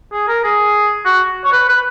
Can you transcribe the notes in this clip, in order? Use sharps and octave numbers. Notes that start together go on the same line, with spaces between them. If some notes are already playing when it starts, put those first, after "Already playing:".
G#4
A#4
G#4
F#4
C#5
B4
B4